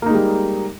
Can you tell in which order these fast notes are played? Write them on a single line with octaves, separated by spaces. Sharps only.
A#3 D#4 G#3 G3